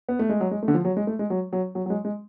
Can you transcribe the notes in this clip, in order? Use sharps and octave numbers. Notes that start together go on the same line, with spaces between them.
B3
A3
G#3
F#3
G#3
A3
D3
F3
F#3
G#3
A3
G#3
F#3
F#3
F#3
F#3
G#3
G#3